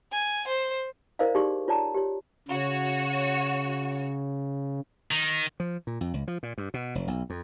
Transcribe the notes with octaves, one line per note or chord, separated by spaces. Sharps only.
G#5
C5
E4 A#4 C5 D5 D#5 F5
D#4 G4 G#4 D5 C6 C#6
F4 C#5 D5 A5 A#5
G4 C#5
C#3 F#4 C#5
D#3
F3
A#2
F2
C#2
F3
A#2
G2
B2
F1
B1
F2